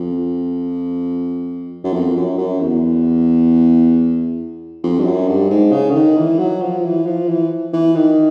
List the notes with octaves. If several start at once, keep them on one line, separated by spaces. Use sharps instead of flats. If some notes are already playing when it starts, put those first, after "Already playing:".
Already playing: F2
F#2
F2
F#2
F#2
E2
F2
G2
F#2
G2
G#2
C#3
D3
D#3
E3
F#3
F3
E3
F3
E3
E3
D#3